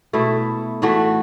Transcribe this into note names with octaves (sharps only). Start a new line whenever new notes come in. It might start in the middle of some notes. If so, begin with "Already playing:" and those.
B2 A3 E4
A2 E3 A3 F#4